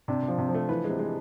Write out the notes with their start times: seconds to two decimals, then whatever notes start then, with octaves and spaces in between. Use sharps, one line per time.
0.08 C3 D4
0.23 C3
0.28 F3
0.38 C3
0.49 F3
0.54 A3
0.69 E3 B4
0.85 C3 G#3
0.99 G#3